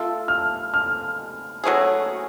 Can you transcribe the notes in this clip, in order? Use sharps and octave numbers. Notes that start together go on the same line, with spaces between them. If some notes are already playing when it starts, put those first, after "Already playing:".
Already playing: A3 F4 A4
F6
F6
F#3 A3 C#4 G#4